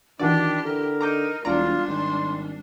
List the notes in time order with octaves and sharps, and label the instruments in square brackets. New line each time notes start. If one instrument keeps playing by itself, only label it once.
[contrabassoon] D#3 [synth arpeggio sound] E3 F#4 D5 [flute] D4 [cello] E4 G4
[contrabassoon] D3 [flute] A#4
[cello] D#4 [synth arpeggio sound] A#5 D6 G6
[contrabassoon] E1 [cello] G3 D4 [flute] F4 [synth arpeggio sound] D5 A#5
[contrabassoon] G#1 [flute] C6